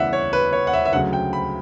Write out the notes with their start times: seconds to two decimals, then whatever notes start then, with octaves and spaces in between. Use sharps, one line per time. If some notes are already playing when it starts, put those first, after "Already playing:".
Already playing: D2 C#3 E3 B3 D5 E5 F#5
0.13 C#5
0.33 B4
0.53 C#5
0.67 F#5
0.73 E5
0.85 E5
0.93 D2 C#3 F#3 F#5
1.13 G5
1.33 B5